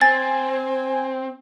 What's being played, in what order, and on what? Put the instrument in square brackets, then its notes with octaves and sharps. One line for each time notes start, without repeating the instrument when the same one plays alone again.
[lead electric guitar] C4 [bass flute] C5 [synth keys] G#5 [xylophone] A6